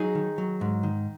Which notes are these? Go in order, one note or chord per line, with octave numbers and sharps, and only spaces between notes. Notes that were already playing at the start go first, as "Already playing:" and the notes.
Already playing: F#3 D#4 G#4
D#3
F#3
G#2
D#3